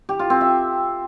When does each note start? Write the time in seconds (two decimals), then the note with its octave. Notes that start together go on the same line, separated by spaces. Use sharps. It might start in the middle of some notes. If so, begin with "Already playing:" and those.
0.09 G4
0.19 F4
0.30 C4
0.41 E5